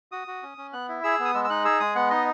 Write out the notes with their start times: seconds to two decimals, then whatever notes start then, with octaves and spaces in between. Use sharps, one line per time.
0.12 F#4 D#6
0.28 F#4
0.43 C#4
0.58 C#4
0.73 B3 F#6
0.88 E4
1.03 G#4 E6
1.19 B3
1.25 D#6
1.34 G#3 E6
1.45 E6
1.50 D#4 F#6
1.65 G#4 E6
1.80 G#3 D#6
1.95 B3 F#5
2.10 D#4 D#5